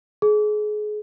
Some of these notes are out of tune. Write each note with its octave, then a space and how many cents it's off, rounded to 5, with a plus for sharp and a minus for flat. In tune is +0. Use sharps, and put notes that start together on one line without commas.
G#4 +30